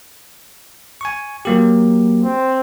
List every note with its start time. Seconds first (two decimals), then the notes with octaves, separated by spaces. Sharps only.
1.01 G#5 C#6
1.45 F#3 A#3 G4
2.24 C4